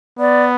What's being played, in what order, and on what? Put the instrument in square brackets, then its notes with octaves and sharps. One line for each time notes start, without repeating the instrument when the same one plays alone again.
[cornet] B3 [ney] D5